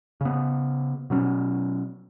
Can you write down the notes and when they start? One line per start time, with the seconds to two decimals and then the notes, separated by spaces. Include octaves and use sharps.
0.21 C#3 B3
1.10 B2 F#3 C#4